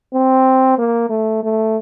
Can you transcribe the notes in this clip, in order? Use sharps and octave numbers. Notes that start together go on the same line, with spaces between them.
C4
A#3
A3
A3